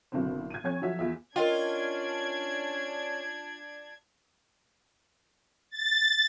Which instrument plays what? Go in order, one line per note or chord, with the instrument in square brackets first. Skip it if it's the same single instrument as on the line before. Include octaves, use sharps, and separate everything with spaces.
[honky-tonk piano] F#1 B2 D3 C4 C5
G#6 D#7
F2 C#5 G#5 G#6
F3 F#3 F4 F#4 E5
E2 F4 E5
[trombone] C#4 [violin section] D4 G#6 [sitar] F4 [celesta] A#4 D#5 G5
[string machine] A6